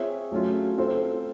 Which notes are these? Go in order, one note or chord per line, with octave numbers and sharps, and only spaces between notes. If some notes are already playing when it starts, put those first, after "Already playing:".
Already playing: C4 F4 G#4 C#5 E5
F#3 A3 C#4 F4
C4 F4 A4 C5